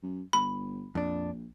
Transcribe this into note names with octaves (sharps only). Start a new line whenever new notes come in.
F#2
G1 B5
A#1 F2 D4